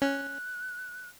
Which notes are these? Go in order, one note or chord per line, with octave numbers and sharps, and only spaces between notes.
C#4 F#6